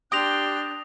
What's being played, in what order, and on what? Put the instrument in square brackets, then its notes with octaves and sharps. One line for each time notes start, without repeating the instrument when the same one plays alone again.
[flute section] D4 F#6 [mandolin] G4 [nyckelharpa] G5 C6 [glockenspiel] D#6 A#6 F7